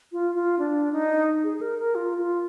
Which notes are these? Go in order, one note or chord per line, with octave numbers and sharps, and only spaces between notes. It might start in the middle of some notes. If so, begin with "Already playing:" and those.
F4
F4
D4
D#4
G#4
G#4
A#4
A#4
F4
F4